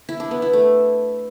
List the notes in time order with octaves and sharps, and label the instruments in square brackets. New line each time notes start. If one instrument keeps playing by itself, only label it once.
[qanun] E4
D4
B3
E4
A3